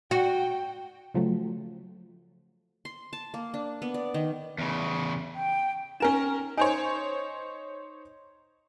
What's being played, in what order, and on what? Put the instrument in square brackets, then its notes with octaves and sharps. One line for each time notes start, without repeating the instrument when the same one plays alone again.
[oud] F#4 [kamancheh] G5
[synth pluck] C#3 F3 F#3 A3
[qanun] C6
A5
A#3
D4
B3
D5
D#3
[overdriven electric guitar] E2 C#3
[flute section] G5
[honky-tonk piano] C#4 A#4 E7 [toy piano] D#4 G#5
[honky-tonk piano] D#4 C5 C#5 [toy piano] G#5